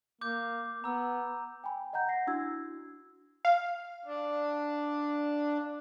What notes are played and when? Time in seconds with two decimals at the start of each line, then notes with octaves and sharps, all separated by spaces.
0.21 A#3 D6 G6
0.84 B3 A#5 E6
1.64 G5 G#5 B5
1.93 D#5 F#5 A#5 G6
2.08 F#5 A#6 C7
2.27 D4 E4 F#4 E6 G#6
3.45 F5
4.05 D4